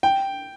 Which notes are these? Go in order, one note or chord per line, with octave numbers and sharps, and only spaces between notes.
G5